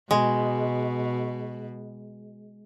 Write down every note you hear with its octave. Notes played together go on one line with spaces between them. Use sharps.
B2 G#3